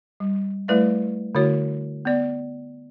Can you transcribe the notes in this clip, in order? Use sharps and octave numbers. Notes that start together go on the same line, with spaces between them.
G3
G3 A3 E4 B4 D5 E5
D3 A3 E4 F#4 C#5
B3 D5